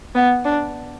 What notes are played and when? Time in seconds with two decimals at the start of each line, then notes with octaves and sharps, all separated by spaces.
0.15 B3
0.45 D4